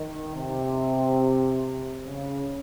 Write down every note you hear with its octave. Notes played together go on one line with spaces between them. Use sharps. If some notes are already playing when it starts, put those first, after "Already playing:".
Already playing: D#3
C3
C#3